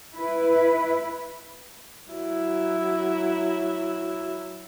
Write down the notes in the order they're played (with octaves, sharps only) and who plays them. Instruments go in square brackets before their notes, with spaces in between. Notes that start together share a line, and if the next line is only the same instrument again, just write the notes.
[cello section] E4 B4
[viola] F#3 E4